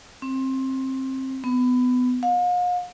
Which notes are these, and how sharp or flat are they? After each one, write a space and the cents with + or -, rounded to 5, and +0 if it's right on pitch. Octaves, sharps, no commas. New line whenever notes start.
C4 +20
B3 +20
F5 +45